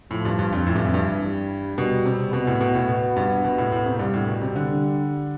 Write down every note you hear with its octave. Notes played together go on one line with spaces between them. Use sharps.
A2 F3
G2
G2
F2
A2 E3
G2
F2
G2
G3
B2 G3
C3
B2 B3
A2
B2
A2
B2
G2
B2
A2
A2
C3
G2 G3
A2
B2
C3
D3